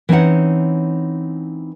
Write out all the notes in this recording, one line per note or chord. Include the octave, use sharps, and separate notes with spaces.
E3 C4 C#4 D#4 C#5 F#5